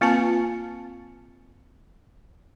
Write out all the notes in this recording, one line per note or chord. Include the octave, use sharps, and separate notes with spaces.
A#3 C4 F4 B4 G#5 A5